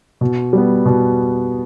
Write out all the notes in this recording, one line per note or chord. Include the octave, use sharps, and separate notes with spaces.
B2
G3 B3
B2